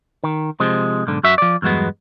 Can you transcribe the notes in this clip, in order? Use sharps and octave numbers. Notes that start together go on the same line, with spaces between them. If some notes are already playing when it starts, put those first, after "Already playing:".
D#3
C3 F3 G#3
B1 G#2 D3
F#2 F#4 E5
F3 D5
E2 G2 F#3 G#3 B3